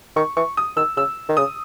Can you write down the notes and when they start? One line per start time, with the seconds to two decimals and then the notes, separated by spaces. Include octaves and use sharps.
0.16 D#3 C#6
0.37 E3 C#6
0.57 D#6
0.77 D#3 E6
0.97 C#3 E6
1.29 D#3
1.37 C#3 D#6